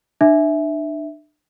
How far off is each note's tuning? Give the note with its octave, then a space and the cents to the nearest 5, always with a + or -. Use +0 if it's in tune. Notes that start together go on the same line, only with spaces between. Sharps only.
D4 +35 E5 -10